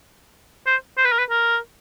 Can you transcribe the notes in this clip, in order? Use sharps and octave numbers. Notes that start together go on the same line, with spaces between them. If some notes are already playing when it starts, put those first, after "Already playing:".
C5
C5
B4
A#4
B4
A#4